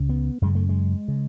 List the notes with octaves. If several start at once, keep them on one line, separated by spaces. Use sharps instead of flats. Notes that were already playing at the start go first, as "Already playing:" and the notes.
Already playing: C#2 C#3
B3
F#2 C#3 G#3
A3
G#3
C#3